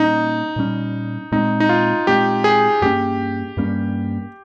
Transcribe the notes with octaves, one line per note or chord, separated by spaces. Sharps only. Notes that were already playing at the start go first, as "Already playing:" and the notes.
Already playing: A#2 G3 A#3 C#4 D#4
A#2 G3 A#3 C#4
A#2 G#3 C4 D#4
D#4
F4
A#2 G#3 C4 G4
G#4
G2 G3 A#3 C#4 G4
G2 G3 A#3 C#4